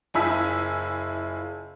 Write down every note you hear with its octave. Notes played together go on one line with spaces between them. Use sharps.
F#1 E4 F4 G#5 E6 B6